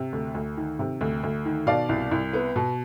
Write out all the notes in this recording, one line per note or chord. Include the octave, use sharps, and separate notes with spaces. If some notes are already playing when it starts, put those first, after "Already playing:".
Already playing: C3
D2
D2
D#3
C3
D2
D2
D#3
B2 D5 F5
C2
C2
B3
B2